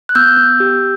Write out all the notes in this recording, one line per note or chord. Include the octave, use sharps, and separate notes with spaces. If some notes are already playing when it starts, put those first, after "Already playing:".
F#6
B3 E6 G6
B3
G4